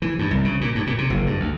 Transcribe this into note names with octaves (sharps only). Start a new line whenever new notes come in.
E3
G2
C2
C#3
A#2
G2
A#2
C3
F#1
G2
D2